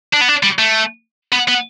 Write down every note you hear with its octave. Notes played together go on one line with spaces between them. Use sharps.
D4
B3
D4
G3
A3
B3
B3